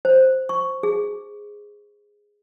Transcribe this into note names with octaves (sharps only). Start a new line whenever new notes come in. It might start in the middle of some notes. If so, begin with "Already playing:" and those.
C5
C#6
G#4